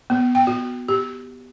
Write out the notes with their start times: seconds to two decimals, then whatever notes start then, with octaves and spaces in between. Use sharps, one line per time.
0.10 B3
0.35 G5
0.47 F#4
0.88 G4